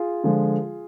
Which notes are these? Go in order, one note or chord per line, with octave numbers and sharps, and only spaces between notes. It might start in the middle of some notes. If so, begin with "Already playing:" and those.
Already playing: F4 G#4
D3 F3 G#3